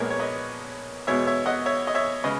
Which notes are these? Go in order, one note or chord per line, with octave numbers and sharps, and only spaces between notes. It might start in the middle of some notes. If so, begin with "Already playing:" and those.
Already playing: A#1 A#2 G#3 B3 A#4 C#5
C#5
B4 D#5
E2 B2 G#3 B3 C#5 E5
C#5 E5
D#5 F#5
C#5 E5
D#5
C#5 E5
C#3 G#3 B4 D#5